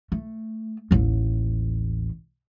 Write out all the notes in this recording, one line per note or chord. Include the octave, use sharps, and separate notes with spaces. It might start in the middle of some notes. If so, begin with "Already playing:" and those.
A3
A1 D#2